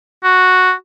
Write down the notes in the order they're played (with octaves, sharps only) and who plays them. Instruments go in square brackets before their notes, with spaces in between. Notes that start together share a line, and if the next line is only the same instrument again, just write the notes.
[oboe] F#4